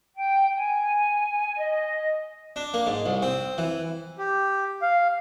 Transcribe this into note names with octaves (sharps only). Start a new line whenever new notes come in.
G5
G#5
D#5
D4
A#3
G#2
C2
C4
E3
G4
F5